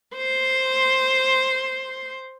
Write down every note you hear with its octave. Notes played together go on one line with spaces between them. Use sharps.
C5 C6